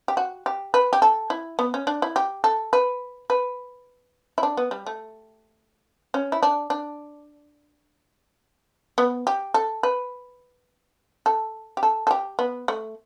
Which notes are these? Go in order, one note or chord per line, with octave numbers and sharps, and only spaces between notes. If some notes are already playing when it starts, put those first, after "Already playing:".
G4
F#4
G4
B4
G4
A4
E4
B3
C#4
D4
E4
G4
A4
B4
B4
E4
D4
B3
G3
A3
C#4
E4
D4
D4
B3
G4
A4
B4
A4
G4
A4
A4
G4
B3
A3